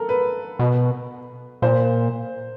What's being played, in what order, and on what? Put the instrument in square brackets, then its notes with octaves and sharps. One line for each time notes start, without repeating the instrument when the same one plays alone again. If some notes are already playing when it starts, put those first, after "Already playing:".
Already playing: [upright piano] A4 A#4
B4
[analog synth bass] B2
[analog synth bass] A#2 [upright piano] C5